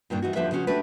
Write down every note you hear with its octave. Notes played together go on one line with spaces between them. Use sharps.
G2 A#2 D#3 D4
E3 D#4 F#4
E2 D3 F3 G4 B4 E5
C#3 F3 C#4 F#4
A3 D4 F#4 G4 B4